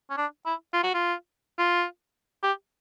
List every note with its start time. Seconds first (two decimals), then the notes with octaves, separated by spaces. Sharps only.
0.10 C#4
0.17 D4
0.46 E4
0.73 F4
0.83 F#4
0.94 F4
1.59 F4
2.43 G4